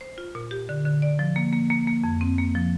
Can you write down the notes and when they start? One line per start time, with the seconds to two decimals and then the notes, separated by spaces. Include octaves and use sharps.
0.01 C5
0.18 F4
0.35 A#2
0.51 G4
0.69 D3
0.85 D3
1.02 D5
1.19 F3
1.36 A#3
1.53 A#3
1.70 A#3
1.87 A#3
2.04 F2
2.21 C4
2.38 A#3
2.55 F3